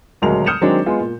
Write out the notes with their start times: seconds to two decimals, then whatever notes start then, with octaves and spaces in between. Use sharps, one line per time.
0.22 D#1 D2 F#3 G#3 A#4 F7
0.46 D#6 F6 G6 C#7 E7 F7
0.61 D#3 F#3 G#3 C4 D4
0.86 G#3 B3 F4 G#4
1.00 A#2